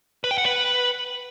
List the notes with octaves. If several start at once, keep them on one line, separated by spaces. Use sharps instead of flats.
B4
G5
F#5
B4